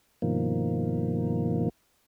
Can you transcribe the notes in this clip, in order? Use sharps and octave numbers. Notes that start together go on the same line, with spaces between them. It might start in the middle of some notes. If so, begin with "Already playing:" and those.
G2 B2 D#3 F3 A#3